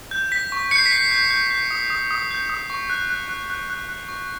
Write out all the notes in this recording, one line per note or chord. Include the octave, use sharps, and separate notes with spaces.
G6
G6 B6
C#6
G6 C#7
C7
B6
G6 C7
G6
G6
G6
D#6
D#6
D#6
G6
D#6
C#6
F#6
F#6
F#6
F#6
F#6
F#6
C#6